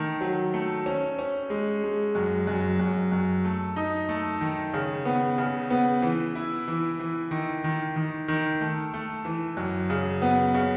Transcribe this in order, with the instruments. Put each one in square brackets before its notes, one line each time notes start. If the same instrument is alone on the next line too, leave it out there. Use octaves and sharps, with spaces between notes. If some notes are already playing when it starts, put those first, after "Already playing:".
Already playing: [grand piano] D#3 A3
F#3
A3
C#4
C#4
G#3
G#3
F#2
F#2
F#2
F#2
A3
D#4
A3
D#3
C#3
B3
C#3
B3
E3
E4
E3
E3
D#3
D#3
D#3
D#3
A3
A3
E3
F#2
C#3
B3
C#3